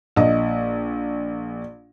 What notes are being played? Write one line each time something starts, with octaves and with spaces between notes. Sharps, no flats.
A#1 D#5